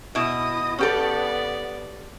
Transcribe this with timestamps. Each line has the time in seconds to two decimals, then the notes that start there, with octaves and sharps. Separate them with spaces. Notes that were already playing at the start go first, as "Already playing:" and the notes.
0.15 B2 E4 D#5 D#6
0.79 B3 C#4 G4 A4 D5